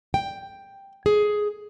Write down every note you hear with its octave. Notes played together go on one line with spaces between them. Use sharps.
G5
G#4